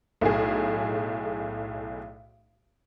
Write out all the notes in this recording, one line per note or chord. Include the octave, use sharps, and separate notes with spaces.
B1 A2 G#4